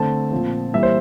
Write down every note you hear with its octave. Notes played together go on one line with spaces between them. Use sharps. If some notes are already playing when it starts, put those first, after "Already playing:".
Already playing: D3 A3 C4 A5
A#2 F3 C4
E3 G3 A#3 E5
C5